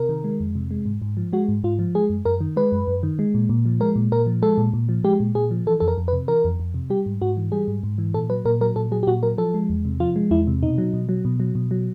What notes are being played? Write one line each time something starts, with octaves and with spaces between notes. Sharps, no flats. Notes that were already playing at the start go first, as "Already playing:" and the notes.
Already playing: C3 A#4
D#3
G#3
F2
C3
G#3
G#2
G#2
F3
G#3 F#4
G#2
G#2 F4
F3
G#3 G#4
F#2
F#2 A#4
D#3
G#3 B4
F#2
F#2
D#3
G#3
A#2
A#2
F3
G#3 A#4
A#2
A#2 A#4
F3
G#3 A4
A#2
A#2
F3
G#3 G4
A#2
A#2 G#4
F3
E3 A4
F2 A4
A#4
F2
B4
C3
E3 A#4
F2
F2
C3
G3 G4
G#2
G#2 F#4
E3
G3 G#4
G#2
G#2
E3
A#2 A4
F#3 B4
A#2 A#4
F#3 A#4
A#2 A4
F#3 G#4
G4
A#2 F#4
F#3 A#4
F3 A4
G#3
E2
C3
F3 F4
G#3
E2 E4
C3
B2 D#4
F#3
B2
F#3
B2
F#3
B2
F#3